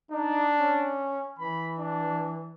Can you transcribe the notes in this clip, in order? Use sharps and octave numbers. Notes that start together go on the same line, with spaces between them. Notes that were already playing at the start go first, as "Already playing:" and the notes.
D4 D#4
C#4
E3 B5
D4